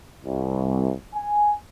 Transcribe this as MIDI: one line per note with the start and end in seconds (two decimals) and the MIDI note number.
0.24 0.93 36
1.15 1.53 80